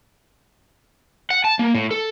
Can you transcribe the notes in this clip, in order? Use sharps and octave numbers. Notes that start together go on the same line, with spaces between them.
F#5
A5
A#3
A2
A4